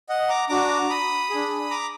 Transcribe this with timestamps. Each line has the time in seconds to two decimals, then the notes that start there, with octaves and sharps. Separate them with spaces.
0.09 D#5 F#5
0.29 A#5 D6
0.49 D4 F#4 A#5 D6
0.90 B5 D#6
1.30 D4 G#4
1.70 A#5 D6